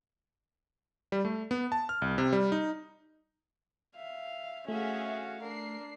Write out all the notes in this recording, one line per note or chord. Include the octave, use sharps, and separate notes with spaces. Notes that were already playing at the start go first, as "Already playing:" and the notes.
G3
A3
B3
A5
F6
C2
C3
G3
D#4
E5 F5
A3 C#4 F#4 G#4 E5 F5
D4 A#4 C7